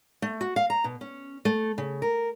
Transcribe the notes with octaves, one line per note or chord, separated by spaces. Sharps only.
A3
F#4
F5
A#5
B2
C#4
A3
C#3
A#4